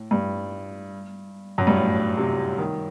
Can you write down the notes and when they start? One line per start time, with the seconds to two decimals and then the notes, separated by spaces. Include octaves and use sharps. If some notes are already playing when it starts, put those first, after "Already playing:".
Already playing: A2
0.11 G2
1.58 F#2
1.67 G2
1.76 A2
2.17 C3
2.58 D#3